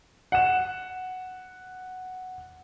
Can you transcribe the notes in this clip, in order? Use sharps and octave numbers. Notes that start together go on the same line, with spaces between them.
F#5 E7